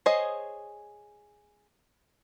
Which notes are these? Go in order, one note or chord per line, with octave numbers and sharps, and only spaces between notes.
G#4 C5 C#5 D#5